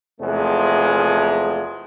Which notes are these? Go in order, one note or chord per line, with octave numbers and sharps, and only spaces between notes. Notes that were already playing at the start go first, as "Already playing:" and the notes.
E2 C3 F3 G#3 A3